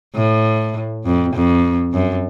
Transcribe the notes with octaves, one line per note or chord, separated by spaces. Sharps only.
A2
F2
F2
F#2